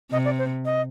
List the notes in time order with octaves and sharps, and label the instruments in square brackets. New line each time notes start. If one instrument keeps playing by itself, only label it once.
[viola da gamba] C3 [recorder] D#5
[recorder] D5
C5
D#5